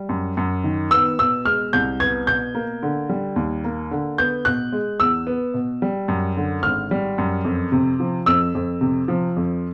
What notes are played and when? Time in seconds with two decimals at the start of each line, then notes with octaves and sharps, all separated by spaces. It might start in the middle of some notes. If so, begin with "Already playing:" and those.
Already playing: G3
0.09 F#2
0.37 F#2
0.64 D#3
0.91 B3 E6
1.19 B2 E6
1.45 G#3 F6
1.73 C2 G6
2.00 B3 G#6
2.27 B2 G6
2.55 A#3
2.83 D3
3.09 G3
3.36 D#2
3.64 A#3
3.91 D3
4.18 B3 G6
4.45 B2 F#6
4.72 G#3
5.00 E2 E6
5.27 B3
5.54 B2
5.82 G3
6.08 F#2
6.37 D3
6.63 G#1 F6
6.91 G3
7.18 F#2
7.45 F2
7.72 C3
8.00 F3
8.26 F2 E6
8.55 F2
8.81 C3
9.08 F3
9.37 F2